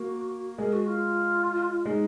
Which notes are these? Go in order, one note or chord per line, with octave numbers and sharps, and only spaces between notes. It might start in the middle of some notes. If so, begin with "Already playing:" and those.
Already playing: A#3 F#4 A#4
G#3 G#4 A#4
F#4
F4
G#3 D#4 G#4